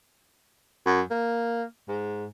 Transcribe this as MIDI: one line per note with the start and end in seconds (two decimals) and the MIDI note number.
0.86 1.01 42
1.11 1.64 58
1.88 2.26 44